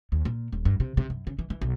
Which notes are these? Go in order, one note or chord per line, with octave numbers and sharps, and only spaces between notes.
D#2
A#2
D#1
G2
C3
C3
F#2
C#3
E3
E3
B1